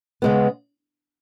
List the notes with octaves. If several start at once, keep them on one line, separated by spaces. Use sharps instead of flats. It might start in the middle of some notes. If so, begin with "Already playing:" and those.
C#3 G#3 B3